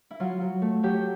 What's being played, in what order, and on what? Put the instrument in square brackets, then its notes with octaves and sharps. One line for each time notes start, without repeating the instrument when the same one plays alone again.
[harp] E4
F#3 F4
F#3
A3
F#3 G4